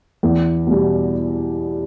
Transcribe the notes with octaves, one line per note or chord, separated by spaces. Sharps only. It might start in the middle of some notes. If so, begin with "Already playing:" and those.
E2
B2 G3